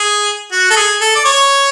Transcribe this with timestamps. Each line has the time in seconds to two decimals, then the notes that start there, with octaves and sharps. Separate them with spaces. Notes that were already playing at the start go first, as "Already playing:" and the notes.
Already playing: G#4
0.52 F#4
0.70 A4
0.76 G#4
1.01 A4
1.15 D5
1.25 C#5